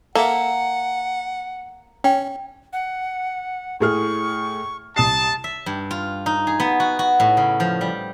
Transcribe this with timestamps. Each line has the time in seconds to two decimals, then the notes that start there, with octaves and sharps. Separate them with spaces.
0.15 A#3 A4 E5 F#5
2.04 C#4 G5
2.73 F#5
3.80 A2 G#4 C#6 F6
4.96 C2 A5 D#6 C7
5.44 E5
5.66 G2
5.91 F4
6.26 D#4
6.47 G#4
6.60 B3
6.80 F#4
6.99 F#4
7.20 A2
7.37 C#3
7.60 F3
7.81 G3